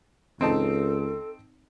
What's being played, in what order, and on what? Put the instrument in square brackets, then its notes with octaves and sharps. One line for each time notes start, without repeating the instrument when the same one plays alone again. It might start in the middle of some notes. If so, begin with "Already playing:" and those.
[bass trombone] C#2 [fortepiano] C4 D#4 A5 [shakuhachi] A4